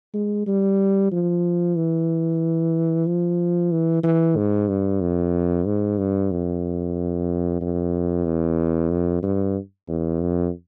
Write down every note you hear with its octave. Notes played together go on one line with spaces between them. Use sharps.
G#3
G3
F3
E3
F3
E3
E3
G#2
G2
F2
G#2
G2
F2
F2
E2
F2
G2
E2
F2